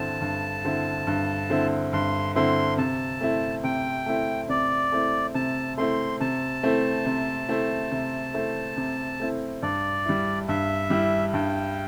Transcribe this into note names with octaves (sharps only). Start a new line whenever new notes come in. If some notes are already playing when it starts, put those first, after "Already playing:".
Already playing: G2 D3 C4 E4 A5
G2
D3 C4 E4
G2
D3 C4 E4
G2 C6
D3 C4 E4 C6
C3 A5
A3 C4 E4
C3 G5
A3 C4 E4
C3 D5
A3 C4 E4
C3 A5
A3 C4 E4 C6
C3 A5
A3 C4 E4
C3
A3 C4 E4
C3
A3 C4 E4
C3
A3 C4 E4
G2 D5
G3 E4
G2 E5
G3 E4
G2 G5